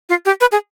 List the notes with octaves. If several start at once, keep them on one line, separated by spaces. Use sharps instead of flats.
F4
G4
B4
G#4